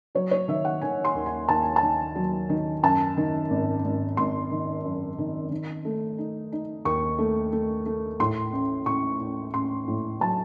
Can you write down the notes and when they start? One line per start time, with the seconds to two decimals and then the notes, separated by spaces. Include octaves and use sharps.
0.15 F#3 C#5
0.31 C#5
0.48 D#3 E5
0.65 F#5
0.82 D#3 G#5
1.05 C6
1.15 D#2
1.26 G#5
1.49 D#2 A5
1.63 G#5
1.76 A5
1.82 D#3
2.15 F#3
2.49 D#3
2.83 F#2 A5
3.17 D#3
3.50 G#1
3.84 G#1
4.17 G#1 C6
4.51 D#3
4.84 F#2
5.18 D#3
5.51 D#3
5.85 A3
6.18 D#4
6.52 D#4
6.85 D#2 C#6
7.19 A3
7.53 A3
7.86 A3
8.20 A2 C6
8.53 A1
8.86 A1 C#6
9.21 A1
9.54 A1 C6
9.87 A2
10.21 F#3 A5